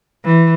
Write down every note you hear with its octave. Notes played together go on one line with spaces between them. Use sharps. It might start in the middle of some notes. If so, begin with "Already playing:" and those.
E3